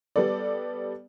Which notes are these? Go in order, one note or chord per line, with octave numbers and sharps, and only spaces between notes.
G3 B3 A4 D5